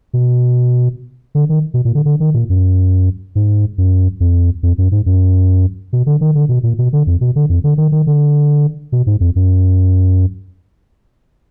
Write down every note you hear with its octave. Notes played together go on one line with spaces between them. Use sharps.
B2
D3
D#3
B2
A#2
D3
D3
D#3
A#2
F#2
G#2
F#2
F2
F2
F#2
G#2
F#2
B2
D3
D#3
D3
B2
A#2
B2
D3
F2
B2
D3
F2
D3
D#3
D#3
D3
B2
G#2
F2
F#2